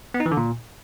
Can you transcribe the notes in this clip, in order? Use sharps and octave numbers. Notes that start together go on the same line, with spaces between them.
B3
D#4
E3
D3
A#2